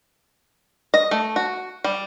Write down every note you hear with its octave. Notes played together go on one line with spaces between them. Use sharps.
D#5
A3
F#4
G3